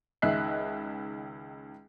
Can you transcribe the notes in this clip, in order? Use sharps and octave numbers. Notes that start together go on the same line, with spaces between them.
C#2 D#3 D#5 E5 F#6 C7